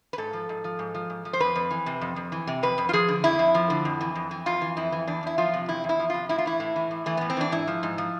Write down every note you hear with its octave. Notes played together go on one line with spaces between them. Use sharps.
B4
G#2 A4
F3
G#2
F3
G#2
F3
G#2
F3
C5
F2 B4
F2
E3
C3
F2
F2
E3
C3
F2 B4
F2
F4
F3 G#4
D3
F2 E4
F2
F3
D3
F2
E3
F2
E3
F2 F4
E3
F2 E4
E3
E2 D4
E2 E4
F3 F4
C3
E2 E4
E2
E4
F3
C3 F4
A2 E4
F4
E3 E4
A2
E3
A2
E3 A3
A2 B3
C4
E3 D4
G#2 E4
F3
G#2
F3